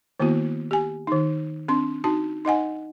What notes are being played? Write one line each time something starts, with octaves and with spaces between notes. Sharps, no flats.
D#3 A#3 B3 E4 F#4
G4 G#5
D#3 D#4
C4 D4 C6
D#4 F#4 A5
D#4 D#5 F#5 G#5